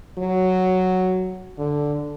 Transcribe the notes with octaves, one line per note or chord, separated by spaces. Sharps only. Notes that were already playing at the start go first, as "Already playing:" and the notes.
F#3
D3